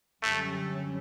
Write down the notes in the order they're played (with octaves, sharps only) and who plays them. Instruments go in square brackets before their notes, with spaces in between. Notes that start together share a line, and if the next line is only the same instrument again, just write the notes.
[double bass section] F#2 D3 G3 C#4 [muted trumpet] A3